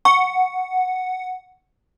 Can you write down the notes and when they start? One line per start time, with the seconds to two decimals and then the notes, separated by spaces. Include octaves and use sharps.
0.05 F#5 C#6